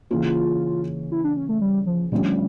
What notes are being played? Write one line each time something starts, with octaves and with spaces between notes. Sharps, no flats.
C#3 E3 A#3 C#4 F4
E4
D4
C#4
A3
G3
F3
D3 F3 G3 A3 C#4